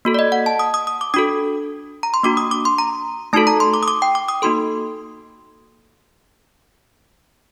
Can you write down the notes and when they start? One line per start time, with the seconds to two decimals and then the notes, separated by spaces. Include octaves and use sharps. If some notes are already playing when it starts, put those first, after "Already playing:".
0.05 A#3 F#4 A4
0.14 D5
0.19 D#5
0.32 F#5
0.46 A5
0.59 D#6
0.74 D#6
0.87 D#6
1.01 D6
1.14 D4 F#4 A4 D#6
2.03 A#5
2.14 C6
2.23 A#3 D4 F#4 D6
2.37 D#6
2.51 D6
2.65 C6
2.78 A#5
3.33 A3 D#4 F#4 A4 A5
3.47 A#5
3.60 C6
3.74 D6
3.83 D#6
3.88 D6
4.02 G5
4.15 D6
4.29 D#6
4.42 A#3 D#4 F#4 A4 C6